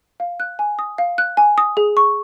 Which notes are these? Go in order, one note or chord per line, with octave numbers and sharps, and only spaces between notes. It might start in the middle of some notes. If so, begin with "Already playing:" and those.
F5
F#6
G#5
D#6
F5
F#6
G#5
D#6
G#4
C#6